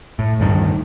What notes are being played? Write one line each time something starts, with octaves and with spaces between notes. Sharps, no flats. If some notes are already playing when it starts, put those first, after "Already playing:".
A2
D2 G2 D#3